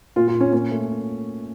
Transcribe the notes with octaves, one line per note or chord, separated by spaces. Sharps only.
A#2 F4
F4
A#2
C#4
A#2 C#4
A3